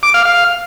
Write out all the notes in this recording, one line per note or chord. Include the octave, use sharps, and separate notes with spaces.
D6
F5
F5